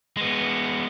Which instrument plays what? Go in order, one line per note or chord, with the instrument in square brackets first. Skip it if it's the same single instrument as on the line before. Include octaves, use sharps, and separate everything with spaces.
[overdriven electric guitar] G#3 B3